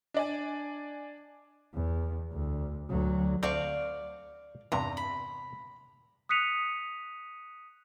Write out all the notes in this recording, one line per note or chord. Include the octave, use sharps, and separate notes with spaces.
D4 D5 G#5
E2
D2
D2 F#3
D2 C4 D5 F5 C#6
E2 G2 C3 A#5
B5
D#6 F#6 B6 C#7 D#7 F7